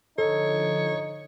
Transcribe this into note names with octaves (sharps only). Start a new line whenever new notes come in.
D3 F3 D#4 A4 C#5